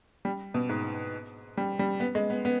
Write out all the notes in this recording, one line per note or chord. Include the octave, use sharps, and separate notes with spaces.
G3
B2
G#2
G3
G3
B3
G#3
B3
B3